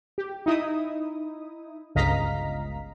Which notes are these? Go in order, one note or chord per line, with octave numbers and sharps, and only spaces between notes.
G4
D#4 E4 D#6
G1 C#2 D#5 F5 A#5 B6